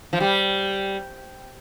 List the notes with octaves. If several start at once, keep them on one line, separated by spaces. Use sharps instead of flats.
F3
G3